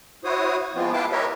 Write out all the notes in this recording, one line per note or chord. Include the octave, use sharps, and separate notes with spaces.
E4 F#4 C5 C#5 D#6
F3 G#3 B3 C4 F4
E4 B4 F5 G5 A5 D6
G4 A#4 B4 C#5 D#5 E5